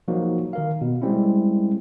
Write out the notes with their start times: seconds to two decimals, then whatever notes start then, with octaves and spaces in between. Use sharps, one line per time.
0.08 F3 F#3 A#3 D#4 F#4
0.53 D#3 A#4 F5
0.81 B2
1.02 G3 G#3 C4 C#4 E4